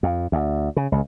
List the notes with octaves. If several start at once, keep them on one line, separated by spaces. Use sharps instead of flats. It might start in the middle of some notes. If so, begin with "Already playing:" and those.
F2
D2
C#3
C#2